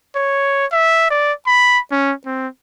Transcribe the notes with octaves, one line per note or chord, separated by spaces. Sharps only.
C#5
E5
D5
B5
C#4
C4